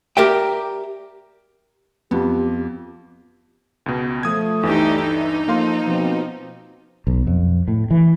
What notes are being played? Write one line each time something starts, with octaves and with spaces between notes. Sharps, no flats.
G4 A#4 D5 E5 G5
F2 B3 F4 G4
C#2 B2
F3 A3 D#6 G#6
G1 D2 E3 D4 D#4 G4 E5
D#4
F3 A#3 A4 F5 C6
B2 F3 C4
B1
F2
A2
E3